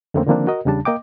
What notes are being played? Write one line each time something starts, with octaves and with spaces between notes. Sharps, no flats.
F2 D3 A3 A#3 C4 C#4
D3 D#3 F3 A#3 C4 D4
F#4 A#4 D#5
E2 C#3 G3 D4 A5
A#3 D#5 G5 D6